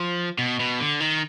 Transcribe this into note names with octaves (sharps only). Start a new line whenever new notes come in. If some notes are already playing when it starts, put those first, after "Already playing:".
Already playing: F3
B2
B2
D3
D#3